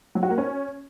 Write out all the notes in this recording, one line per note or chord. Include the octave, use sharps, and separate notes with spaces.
F#3
F#4
A#3
C#4